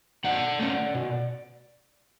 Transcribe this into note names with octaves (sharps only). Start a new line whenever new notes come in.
B2 D5 F#5
A3 C#4
B2